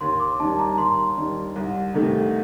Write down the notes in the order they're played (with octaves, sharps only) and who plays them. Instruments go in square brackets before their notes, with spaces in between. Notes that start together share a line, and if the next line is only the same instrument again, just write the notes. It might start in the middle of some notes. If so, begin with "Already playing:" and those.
[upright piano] D#2 [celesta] C6
[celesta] D6
[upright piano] D#3 G3 [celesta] A5
[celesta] A#5
[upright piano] D#2 [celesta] C6
[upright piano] D#3 G3
C2
C3 D#3 A3